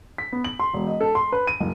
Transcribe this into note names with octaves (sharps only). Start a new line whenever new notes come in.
B6
B3
F#7
C6
E1
D#5
A4
C6
B4
D#7
F#1